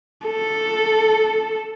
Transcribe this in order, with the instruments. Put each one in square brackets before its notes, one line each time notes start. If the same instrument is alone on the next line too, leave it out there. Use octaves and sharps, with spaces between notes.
[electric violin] A4